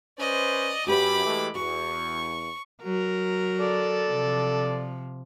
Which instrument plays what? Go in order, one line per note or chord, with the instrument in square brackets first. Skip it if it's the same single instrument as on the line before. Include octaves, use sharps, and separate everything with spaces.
[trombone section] C#4 B4 C5 [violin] D5 D#5
[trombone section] F#2 [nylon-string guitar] F#4 G4 B4 [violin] B5 D6
[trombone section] E3 G#3 A3
[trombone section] E2 [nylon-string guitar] F#4 [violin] C#6
[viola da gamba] F#3 A#4
[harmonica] A4 D5
[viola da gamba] C3 F3